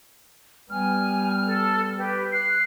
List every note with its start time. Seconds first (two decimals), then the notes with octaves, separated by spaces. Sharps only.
0.70 G3 B3 G#5 F6
1.45 A4
1.97 G4 B4
2.32 F#6 C7